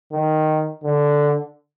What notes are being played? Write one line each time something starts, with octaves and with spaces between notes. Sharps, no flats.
D#3
D3